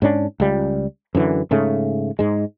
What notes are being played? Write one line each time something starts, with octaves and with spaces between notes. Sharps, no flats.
G#2 C#4 D4
C#2 G3
F#2 D3 E3
G#2 C#3 A3
G#2 G#3